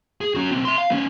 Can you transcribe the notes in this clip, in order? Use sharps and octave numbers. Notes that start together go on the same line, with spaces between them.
G#4
C#4 F#4
B1 C4
E5 C6
F5
B3 C#4